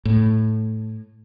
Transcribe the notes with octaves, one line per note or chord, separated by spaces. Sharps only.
A2